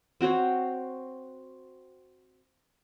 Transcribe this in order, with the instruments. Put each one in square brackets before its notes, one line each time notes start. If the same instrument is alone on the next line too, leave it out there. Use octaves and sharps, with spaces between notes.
[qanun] C4 F#4 C5 C#5